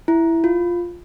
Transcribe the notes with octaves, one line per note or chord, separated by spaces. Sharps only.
E4
F4